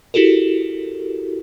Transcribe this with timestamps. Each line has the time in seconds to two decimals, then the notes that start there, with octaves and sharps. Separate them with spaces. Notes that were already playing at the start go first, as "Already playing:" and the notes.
0.14 E4 F#4 G4 A4 A#4